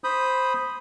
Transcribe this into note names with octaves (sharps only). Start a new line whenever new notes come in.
C5 B5 D#6 G6